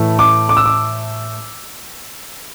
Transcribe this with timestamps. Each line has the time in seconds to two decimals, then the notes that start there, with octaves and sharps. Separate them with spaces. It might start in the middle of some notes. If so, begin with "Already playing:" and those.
Already playing: A2 E3 A3
0.19 D6
0.49 D6
0.57 E6
0.66 D6